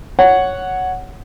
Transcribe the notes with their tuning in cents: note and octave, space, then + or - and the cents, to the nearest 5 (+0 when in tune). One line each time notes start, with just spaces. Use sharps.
C#5 +5 F#5 +0